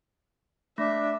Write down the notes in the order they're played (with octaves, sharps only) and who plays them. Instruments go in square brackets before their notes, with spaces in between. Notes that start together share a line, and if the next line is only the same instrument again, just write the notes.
[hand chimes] A3 [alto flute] D4 [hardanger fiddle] E5